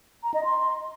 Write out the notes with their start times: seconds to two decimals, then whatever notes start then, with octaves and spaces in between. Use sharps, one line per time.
0.23 A#5
0.34 D#5
0.45 C6